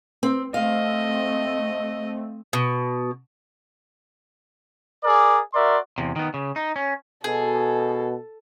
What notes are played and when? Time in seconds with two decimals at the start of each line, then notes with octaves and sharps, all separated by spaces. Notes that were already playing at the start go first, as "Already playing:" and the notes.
0.23 C4
0.54 A3 C4 D#5 F5
2.53 B2
5.03 G#4 A#4 D5
5.53 F#4 A#4 D5 E5 C6
5.98 E2 C3
6.16 D#3 B3
6.34 C#3
6.56 D#4
6.76 C#4
7.24 B2 G#4 A4